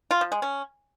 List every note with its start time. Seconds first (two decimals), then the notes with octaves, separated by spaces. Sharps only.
0.11 F4
0.21 F3
0.32 G#3
0.42 C#4